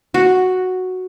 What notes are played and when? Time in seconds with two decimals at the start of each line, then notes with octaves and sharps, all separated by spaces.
0.14 F#4